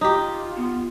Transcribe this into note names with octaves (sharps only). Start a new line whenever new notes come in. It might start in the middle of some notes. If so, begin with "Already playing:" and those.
D#4 F4 G4
B3